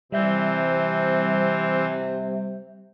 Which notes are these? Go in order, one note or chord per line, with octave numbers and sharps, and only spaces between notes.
C3 E3 G3 C4 E5 G6